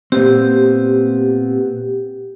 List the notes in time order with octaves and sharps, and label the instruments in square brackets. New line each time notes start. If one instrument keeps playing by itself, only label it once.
[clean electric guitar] A#2 B3 C4 [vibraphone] G4